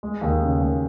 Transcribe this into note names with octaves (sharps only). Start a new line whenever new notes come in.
G#3
D#2
C#3
D#2